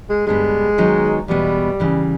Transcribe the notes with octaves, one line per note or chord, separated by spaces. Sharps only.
G#3
G2 D3 G3 G#3 B3
D#3 F#3 B3 D#4
E2 B2 G3 G#3 B3
E2 C#3 E3